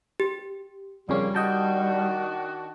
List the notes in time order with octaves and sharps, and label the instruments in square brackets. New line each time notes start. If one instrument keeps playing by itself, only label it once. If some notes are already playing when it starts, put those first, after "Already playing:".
[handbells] G4
[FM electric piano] F2 C#3 C#4 [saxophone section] A#2 A#3 [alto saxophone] G3
[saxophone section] D#3 D4 F#4 [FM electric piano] D#5 G5 A5